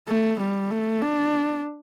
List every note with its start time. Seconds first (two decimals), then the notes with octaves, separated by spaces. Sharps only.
0.09 A3
0.41 G3
0.71 A3
1.01 D4